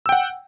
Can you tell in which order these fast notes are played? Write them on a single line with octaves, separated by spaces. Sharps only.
E6 G5 F#5